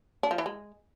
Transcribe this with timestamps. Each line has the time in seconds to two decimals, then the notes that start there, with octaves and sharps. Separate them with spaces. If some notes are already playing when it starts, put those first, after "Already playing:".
0.23 D4
0.31 F3
0.38 E3
0.46 G#3